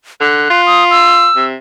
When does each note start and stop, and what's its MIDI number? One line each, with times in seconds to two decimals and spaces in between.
0.20 0.47 50
0.20 0.61 90
0.50 1.27 65
0.67 0.84 87
0.91 1.45 88
1.36 1.55 48